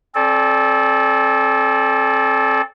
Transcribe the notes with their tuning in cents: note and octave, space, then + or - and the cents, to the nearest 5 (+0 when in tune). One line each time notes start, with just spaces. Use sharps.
C4 +35 A4 -25 D5 +0